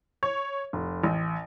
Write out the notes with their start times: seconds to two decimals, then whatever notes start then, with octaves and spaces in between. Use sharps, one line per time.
0.23 C#5
0.73 F1
1.04 A1